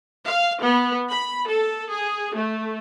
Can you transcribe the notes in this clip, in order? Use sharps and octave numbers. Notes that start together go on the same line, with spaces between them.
F5
B3
B5
A4
G#4
A3